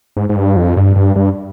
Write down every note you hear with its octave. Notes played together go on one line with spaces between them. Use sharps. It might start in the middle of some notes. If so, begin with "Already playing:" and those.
G#2
G#2
G2
F2
G2
G2
G2